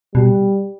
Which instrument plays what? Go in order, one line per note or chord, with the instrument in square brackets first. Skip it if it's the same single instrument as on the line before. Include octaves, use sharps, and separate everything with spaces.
[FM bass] B2 [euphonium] G3